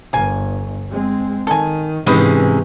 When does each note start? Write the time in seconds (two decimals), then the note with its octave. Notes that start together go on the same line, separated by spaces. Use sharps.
0.13 G1 A#3 G#5
0.91 G#3 C4
1.47 D#3 A4 G#5
2.06 G#2 C3 E3 G#3 C#4 D#4 B4 C#5